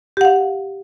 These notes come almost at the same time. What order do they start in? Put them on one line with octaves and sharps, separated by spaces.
G4 F#5 F5